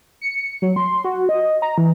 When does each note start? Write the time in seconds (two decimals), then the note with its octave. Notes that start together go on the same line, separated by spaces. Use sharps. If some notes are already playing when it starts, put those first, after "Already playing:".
0.21 C#7
0.62 F#3
0.76 C6
1.04 F#4
1.29 D#5
1.62 A#5
1.78 E3